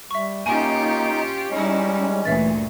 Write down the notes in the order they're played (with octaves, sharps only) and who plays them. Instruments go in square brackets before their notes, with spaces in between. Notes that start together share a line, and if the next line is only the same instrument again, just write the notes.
[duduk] G3 [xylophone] E5 C#6
[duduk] A#3 [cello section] C#4 F4 G4 [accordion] D#4 [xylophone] G#5
[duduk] G3 [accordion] G#3 C#4 [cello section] D#4 E4
[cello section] D2 G2 A#2 [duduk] E3 [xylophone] E5 A6